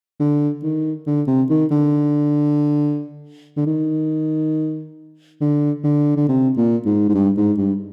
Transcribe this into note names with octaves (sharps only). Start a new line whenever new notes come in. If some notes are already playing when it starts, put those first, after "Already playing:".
D3
D#3
D3
C3
D#3
D3
D3
D#3
D3
D3
D3
C3
A#2
G#2
G#2
G2
G#2
G2